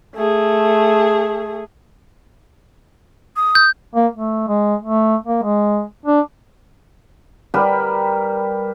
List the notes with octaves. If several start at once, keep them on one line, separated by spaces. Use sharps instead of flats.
A3 G#4
D#6
G6
A#3
A3
G#3
A3
A#3
G#3
D4
G3 G4 A#4 B4